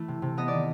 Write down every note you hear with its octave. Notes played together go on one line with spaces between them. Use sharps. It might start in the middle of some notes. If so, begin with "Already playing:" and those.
Already playing: E3 A3
C3
C3
B3 D#5
D#3 D5